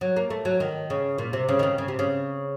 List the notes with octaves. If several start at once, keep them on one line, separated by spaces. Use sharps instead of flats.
F#3
A#3
A3
F#3
D#3
C#3
A#2
C3
C#3
D#3
C#3
C#3
C3
C#3